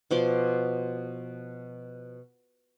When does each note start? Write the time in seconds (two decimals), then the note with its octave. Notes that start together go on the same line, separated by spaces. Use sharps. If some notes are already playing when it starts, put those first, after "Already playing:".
0.11 B2 F3 C6 D6